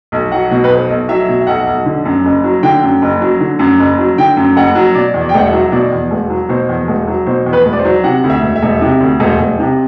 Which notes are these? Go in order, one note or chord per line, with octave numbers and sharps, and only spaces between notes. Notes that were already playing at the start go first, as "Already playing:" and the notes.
B1
F#3 F#5
B2
B4
B1 C5
B1
F#3 E5
B2
E5
B1 F#5
B1
D3
F#2
F#1
F#3
D3 G5
F#2
F#1
F#3
D3
F#2
F#1
F#3
D3 G5
F#2
F#1 F#5
F#3
B2 D5
E2
D5
G5
E1 F#5
E5
F#3
B2 D5
E2
E1
F#3
B2 C5
E2
E1
F#3
B2 C5
E2
B4
E1
D5
C5
F#3
C3 F#5
D2
E5
E1
E5
E1
C3
D2
E1
E1
C3